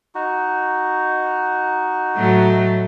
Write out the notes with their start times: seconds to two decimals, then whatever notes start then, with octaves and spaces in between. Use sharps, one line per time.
0.15 D#4 F#4
2.17 A2 F#3 A3